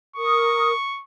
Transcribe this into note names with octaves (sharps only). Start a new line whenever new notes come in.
A#4 C#6 D#6